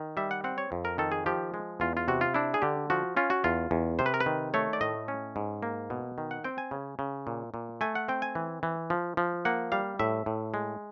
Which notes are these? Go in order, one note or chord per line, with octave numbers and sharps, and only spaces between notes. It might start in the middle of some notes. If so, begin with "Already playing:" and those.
Already playing: D#3
G3 E5
F#5
C4 F#5
C#5
F2
A#4
D#3 A4
G#4
F3 G4
G#3
E2 F4
F4
C3 F#4
F4
D4 E4
G#4
D3 G4
F3 F#4
C#4 F4
F#4
E2 F4
E2
C3 C5
B4
A#4
B4
D#3
A3 C#5
D5
A2 D#5
C#4
G#2
A#3
B2
D#3
F#5
C4 G5
G#5
C#3
C#3
A#2
A#2
A3 G#5
F#5
C4 G5
G#5
E3
E3
F3
F3
A#3 F#5
G3 F5
A2 E5
A2
G#3